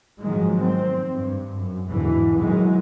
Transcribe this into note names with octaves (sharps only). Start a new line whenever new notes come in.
G#2 D#3 F3 F#3 G#3
C4
G2
F#2
E2 G#2 B2 D3 E3
B2 D#3 E3 F#3 G#3